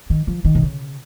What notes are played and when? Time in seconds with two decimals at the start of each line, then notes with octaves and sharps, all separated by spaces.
0.10 D#3
0.27 F3
0.45 D#3
0.55 C3
0.63 C#3